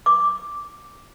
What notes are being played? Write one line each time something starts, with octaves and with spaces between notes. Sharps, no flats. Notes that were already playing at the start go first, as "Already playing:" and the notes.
D6